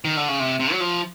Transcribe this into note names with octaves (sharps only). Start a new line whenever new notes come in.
D#3
D3
C#3
C3
C3
F#3
F3